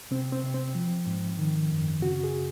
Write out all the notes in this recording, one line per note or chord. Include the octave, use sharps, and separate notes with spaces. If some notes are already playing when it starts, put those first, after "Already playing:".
C3 C4
C4
C3
C4
F3
G#2
D#3
F#2
C#3 F#4
G#4